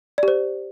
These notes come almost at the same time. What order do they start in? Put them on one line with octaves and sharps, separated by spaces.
D5 G4 C5